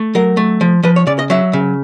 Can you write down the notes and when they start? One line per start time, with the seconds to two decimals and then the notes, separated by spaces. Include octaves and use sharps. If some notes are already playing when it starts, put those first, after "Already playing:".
Already playing: A3
0.15 F#3 A#4
0.37 A3
0.61 F3
0.83 F3 B4
0.96 C#5
1.07 C#3 D5
1.19 D#5
1.30 F#3 E5
1.53 C#3